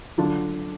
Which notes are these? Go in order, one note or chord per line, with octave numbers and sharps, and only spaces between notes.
D3 F#3 D4 F4